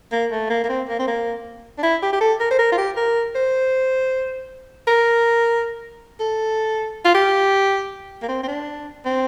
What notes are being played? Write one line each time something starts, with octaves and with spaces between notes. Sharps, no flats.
A#3
A3
A#3
A#3
C4
A#3
C4
A#3
D4
E4
G4
G4
A4
A#4
C5
A#4
F4
G4
A#4
C5
A#4
A4
F4
G4
A#3
C4
C4
D4
C4